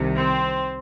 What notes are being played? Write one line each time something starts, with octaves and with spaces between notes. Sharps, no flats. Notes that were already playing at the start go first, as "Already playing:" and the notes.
Already playing: C2 C3 D#3
C4